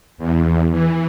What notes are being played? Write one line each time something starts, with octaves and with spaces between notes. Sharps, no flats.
E2
E3